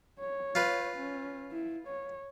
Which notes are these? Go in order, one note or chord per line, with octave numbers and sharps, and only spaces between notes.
C#5
F4 B4
C#4
E4
C#5